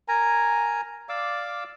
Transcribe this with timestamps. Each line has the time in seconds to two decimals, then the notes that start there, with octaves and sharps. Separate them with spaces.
0.08 A#4 G#5 A#5
1.09 D5 F5 D6 E6